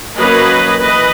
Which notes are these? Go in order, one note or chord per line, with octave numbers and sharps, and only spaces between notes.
F#3 A#3 C#4 B4 D#5
E3 B4 D#5